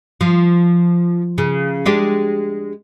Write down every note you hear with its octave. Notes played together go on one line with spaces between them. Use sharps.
F3
C#3
G#3 D4 G4